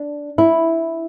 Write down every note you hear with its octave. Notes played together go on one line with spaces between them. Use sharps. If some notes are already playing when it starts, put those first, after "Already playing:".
Already playing: D4
E4